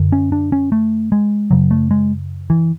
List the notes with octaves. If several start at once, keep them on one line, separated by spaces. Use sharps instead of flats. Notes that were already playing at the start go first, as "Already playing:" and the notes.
Already playing: F#2 D3
C#4
D4
C#4
A3
G#3
F#2 C#3 F#3
A3
G#3
E3